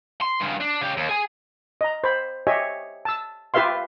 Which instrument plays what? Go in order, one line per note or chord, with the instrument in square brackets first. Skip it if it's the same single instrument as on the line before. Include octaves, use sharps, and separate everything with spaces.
[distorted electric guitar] C6
G2 C#3
D4
C#3 G4
D#2
G#4 G#5
[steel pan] D#5 A#5
C5 B5
G4 C#5 D#5 E5 G#5
A5 E6
F4 G4 B4 E5 F5 C6